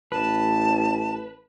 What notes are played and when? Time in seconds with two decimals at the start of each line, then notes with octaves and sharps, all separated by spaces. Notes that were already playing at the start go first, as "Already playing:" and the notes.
0.12 A1 B4 A5